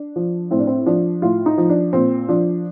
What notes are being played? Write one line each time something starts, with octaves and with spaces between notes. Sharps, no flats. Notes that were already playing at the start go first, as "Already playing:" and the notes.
Already playing: D4
F3
A2 C4
D4
C4
F3 D4
A2 F4
D#4
F3
D4
A#2 C4
F3 D4